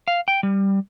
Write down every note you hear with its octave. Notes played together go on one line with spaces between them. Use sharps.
F5
G5
G3